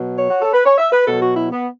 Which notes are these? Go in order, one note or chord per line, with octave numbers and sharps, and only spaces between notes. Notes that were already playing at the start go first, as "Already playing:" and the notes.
Already playing: B2 F#3
C#5
F#4
A4
B4
C#5
E5
B4
B2 F#3 A4
F#4
E4
B3